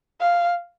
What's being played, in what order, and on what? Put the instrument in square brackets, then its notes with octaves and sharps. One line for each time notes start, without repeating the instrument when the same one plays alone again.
[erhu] F5